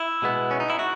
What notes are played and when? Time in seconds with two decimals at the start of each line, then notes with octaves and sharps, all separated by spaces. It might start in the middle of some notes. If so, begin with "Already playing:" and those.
Already playing: E4
0.22 B2 G#3 B3
0.51 C#4
0.60 D#4
0.70 E4
0.79 F#4